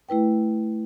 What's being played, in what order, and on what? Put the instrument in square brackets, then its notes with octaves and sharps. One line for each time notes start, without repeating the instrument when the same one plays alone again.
[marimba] A3 E4 B4 G5